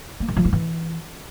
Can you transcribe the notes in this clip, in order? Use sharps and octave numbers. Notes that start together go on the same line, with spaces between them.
A#3
D#3
F3
E4
E3